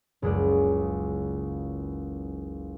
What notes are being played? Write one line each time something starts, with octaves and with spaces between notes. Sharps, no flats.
F#1 C#2 C#3 G#3 D5